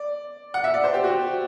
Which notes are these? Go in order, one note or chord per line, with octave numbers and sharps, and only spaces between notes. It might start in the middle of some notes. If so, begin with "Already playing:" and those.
Already playing: D5
F#5
E5
D5
C5
G4
F#4